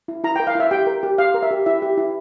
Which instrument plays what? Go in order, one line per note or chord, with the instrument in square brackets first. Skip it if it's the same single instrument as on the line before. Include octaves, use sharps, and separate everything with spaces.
[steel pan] E4
E4 A#5
G5
A#4
F5
E4 E5
G4 G5
A#4
G4
G4 F5
A#4
E5
G4
E4 E5
G4
E4